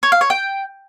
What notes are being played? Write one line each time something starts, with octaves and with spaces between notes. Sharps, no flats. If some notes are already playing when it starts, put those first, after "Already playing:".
C#5
F5
C#5
G5